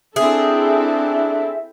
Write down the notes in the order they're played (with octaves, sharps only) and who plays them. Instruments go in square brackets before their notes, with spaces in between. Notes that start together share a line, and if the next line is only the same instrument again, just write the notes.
[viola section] C4 E4 A4 [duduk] D4 [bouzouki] G#4 [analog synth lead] E5